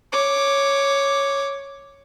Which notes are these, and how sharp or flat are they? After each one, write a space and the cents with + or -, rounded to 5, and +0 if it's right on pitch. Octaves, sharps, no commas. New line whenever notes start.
C#5 +0 D6 +0